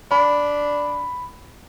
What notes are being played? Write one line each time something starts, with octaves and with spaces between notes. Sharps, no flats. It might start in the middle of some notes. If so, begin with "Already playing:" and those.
D4 B5